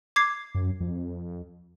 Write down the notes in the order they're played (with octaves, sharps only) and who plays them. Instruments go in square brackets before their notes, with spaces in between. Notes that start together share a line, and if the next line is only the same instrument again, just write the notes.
[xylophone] D6 G#6 C7
[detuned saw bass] F#2
F2